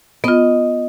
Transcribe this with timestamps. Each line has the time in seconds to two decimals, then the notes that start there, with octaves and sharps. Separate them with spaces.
0.24 B3 F4 D#5